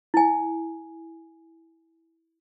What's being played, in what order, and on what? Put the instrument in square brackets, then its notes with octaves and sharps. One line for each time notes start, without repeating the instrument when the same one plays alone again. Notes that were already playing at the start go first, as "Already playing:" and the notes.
[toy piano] E4 G#5